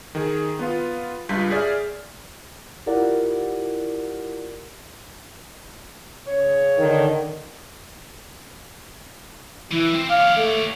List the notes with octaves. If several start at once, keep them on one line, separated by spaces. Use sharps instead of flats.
D#3 G#4
B3 F4
C#2 G2 F4 G6 B6
G#4 D5 E5 F6
E4 F4 G4 A#4 D5 F#5
C#3 C#5
D3 D#3
E3 E4
C4
G4 C#5 F5
A3